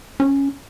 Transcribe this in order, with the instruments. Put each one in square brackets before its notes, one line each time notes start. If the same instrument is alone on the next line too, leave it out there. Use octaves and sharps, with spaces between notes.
[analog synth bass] C#4